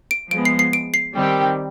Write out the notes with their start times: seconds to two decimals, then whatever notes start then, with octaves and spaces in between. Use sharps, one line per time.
0.11 D7
0.31 F3 G#3 B3 D7
0.45 C7
0.59 C7
0.73 D7
0.94 C7
1.15 D#3 G3 C4 G4